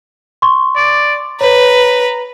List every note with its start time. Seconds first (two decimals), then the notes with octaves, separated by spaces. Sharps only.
0.42 C6 C#6
0.76 D5
1.41 B4 C#5 A#5